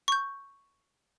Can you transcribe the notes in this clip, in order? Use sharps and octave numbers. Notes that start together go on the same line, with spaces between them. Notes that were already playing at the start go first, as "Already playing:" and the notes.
C#6 G6